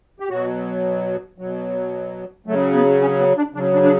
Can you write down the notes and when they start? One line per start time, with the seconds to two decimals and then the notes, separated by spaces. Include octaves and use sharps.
0.20 G4
0.29 B2 F#3 F#4
1.38 B2 F#3
2.46 C#3 F#3 A3
2.74 B3
3.01 C#4
3.19 B3
3.37 D4
3.54 C#3 F#3 D4
3.73 D4
3.83 D4